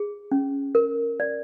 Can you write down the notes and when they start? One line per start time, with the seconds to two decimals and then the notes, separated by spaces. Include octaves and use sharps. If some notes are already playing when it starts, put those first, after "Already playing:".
Already playing: G#4
0.32 C#4
0.75 A#4
1.20 D5